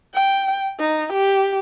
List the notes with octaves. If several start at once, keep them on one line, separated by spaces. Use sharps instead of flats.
G5
D#4
G4